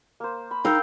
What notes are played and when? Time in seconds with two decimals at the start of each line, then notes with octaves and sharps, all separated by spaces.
0.20 A#3 C5
0.51 B5
0.65 D#4 A#4 F5 G5 E6 G6